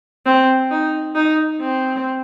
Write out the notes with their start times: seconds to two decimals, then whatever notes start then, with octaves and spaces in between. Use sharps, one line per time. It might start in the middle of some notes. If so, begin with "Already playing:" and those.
0.26 C4
0.71 D#4
1.16 D#4
1.61 C4